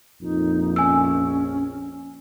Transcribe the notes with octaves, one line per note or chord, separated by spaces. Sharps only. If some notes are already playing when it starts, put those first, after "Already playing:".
A#1 F2 D#4
C#4 G#5 E6